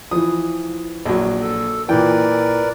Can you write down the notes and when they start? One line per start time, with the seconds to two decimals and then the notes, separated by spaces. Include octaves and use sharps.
0.11 E3 F3 D#6
1.05 A#1 F#3
1.41 A4
1.89 A#2 E3 A#4 B4 D5 G5